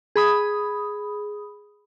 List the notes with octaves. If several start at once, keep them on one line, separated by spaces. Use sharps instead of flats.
G#4 B5 D#6